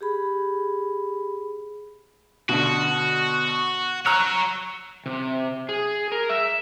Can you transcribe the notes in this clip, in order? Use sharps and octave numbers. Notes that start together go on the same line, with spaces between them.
G4 G#4 B5
B2 D3 F#4
F#4 C#5 A#5 E6 F#6
C3
G#4
A#4
E5